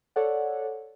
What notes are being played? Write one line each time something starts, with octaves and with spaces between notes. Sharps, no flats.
A4 C#5 D5 F#5